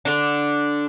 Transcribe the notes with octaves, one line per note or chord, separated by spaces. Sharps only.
D3 D4